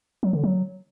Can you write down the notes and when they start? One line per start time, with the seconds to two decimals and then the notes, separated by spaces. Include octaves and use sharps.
0.23 F#3
0.33 D3
0.44 F#3